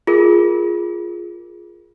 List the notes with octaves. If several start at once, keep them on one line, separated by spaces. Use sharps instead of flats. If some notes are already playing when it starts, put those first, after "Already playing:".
F4 G#4 A#4